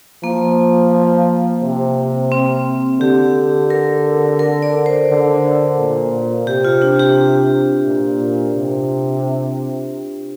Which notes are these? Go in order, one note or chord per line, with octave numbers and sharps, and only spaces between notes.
F3 A#3
C3
C4
D3 G4
A#4
A#4
D5
C5
D3
A#2
C3 G4
F4
D4
G4
A#2
C3